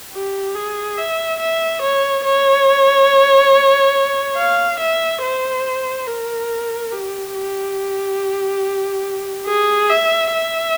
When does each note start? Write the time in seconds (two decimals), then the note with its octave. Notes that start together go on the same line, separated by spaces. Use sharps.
0.13 G4
0.55 G#4
0.97 E5
1.40 E5
1.82 C#5
2.25 C#5
4.37 F5
4.80 E5
5.22 C5
6.07 A#4
6.92 G4
7.35 G4
9.47 G#4
9.89 E5
10.32 E5